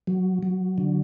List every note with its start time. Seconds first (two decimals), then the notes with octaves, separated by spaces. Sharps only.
0.07 F#3
0.43 F#3
0.78 D3